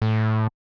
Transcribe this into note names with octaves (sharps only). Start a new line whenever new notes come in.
A2